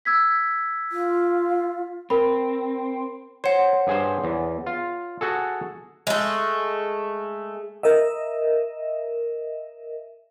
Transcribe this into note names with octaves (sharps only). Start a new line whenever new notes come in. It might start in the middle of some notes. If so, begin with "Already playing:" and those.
E6 G#6 B6
F4
C4 A#4 B5
C5 C#5 F#5
G2 G#4 C5
E2
F4
F#4 G#4 A4
G#3 A3
A#4 D#5 E5